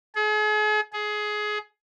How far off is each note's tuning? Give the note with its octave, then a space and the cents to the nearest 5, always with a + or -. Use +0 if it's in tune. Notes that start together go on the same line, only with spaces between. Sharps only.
G#4 +40
G#4 +20